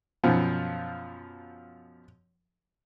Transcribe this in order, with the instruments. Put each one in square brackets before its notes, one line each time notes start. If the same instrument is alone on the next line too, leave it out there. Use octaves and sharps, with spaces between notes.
[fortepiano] F#2 B2 F3